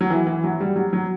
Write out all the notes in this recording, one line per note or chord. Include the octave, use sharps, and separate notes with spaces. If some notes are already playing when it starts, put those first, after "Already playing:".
F#3
E3
E3
F#3
G3
F#3
F#3